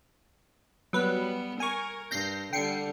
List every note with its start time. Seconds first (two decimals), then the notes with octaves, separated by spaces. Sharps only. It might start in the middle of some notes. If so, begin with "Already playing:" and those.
0.93 F#3 G3 B3 B4
1.60 A#4 G#5 C#6
2.11 G2 G6 A#6 C7
2.53 D3 G3 G5 C7 C#7